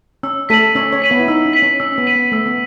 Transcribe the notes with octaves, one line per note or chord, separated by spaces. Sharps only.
C#4 E6
A3 A4 B6 D#7 F#7
C#4 C#5 E6
C#4 C#5
B6 D#7 F#7
B3 B4
E4
D#4 E6
C#4
B6 D#7 F#7
C#4
C#4 E6
C#4
B3
B6 D#7 F#7
B3
A3 E6
B3